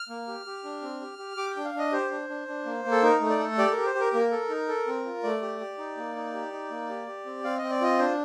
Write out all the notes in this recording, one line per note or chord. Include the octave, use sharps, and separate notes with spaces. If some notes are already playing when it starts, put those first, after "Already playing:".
Already playing: F6
A#3
G4
G4
D4
C4
G4
G4
G4 D6
G5
D4
F5
D4 D#5
G4 C5
D4
D4
D4
A#3
A#3
A4
D#4 A#4
A3
D5
A4
G4 D5
G4 A#4
C5
G4 A#4
A#3 A#4
A4
D#4
A4
C4
F4
A3 D5
G4
G4
D#4
A#3
D#4
G4
D#4
A#3
G4
G4
C4
C4 F5
C4 D#5
D5
F4 D#5
D4 C5